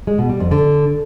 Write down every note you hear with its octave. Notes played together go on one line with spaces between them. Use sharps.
G#3
B2
G3
F2
D3